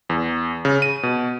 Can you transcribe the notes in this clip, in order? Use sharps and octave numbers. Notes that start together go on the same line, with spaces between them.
E2
C#3
D#7
B2